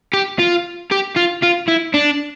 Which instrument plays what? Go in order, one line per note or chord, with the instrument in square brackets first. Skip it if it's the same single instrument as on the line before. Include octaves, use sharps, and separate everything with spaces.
[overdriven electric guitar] G4
F4
G4
F4
F4
E4
D4